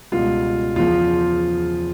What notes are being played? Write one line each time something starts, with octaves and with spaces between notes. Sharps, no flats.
C#2 B2 G3 F4
E2 C#3 F3 F4